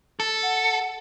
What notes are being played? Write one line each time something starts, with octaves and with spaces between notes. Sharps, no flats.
A4
F#5